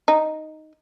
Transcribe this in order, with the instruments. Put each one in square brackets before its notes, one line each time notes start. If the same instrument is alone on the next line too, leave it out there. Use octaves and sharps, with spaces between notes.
[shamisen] D#4